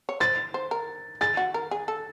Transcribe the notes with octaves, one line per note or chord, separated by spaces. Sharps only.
C#5
C5 A6
C5
A#4
G#4 A6
F#4
A#4
G#4
A4